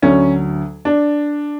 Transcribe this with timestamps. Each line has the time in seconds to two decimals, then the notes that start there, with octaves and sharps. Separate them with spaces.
0.02 D2 D3 F#3 C#4
0.85 D4